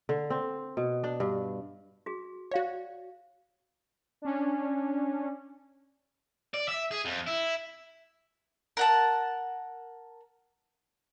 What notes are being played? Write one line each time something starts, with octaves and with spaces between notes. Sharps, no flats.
D3
C4
B2
D4
G2
F#4 G#4
F#4 C#5 D5 F5
C#4 D4
D5
E5
G#4
F2
E4
A#4 F#5 A5